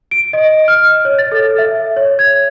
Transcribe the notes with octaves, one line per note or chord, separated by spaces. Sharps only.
D7
D#5
F6
C#5
A6
A4
E5
C#5
G#6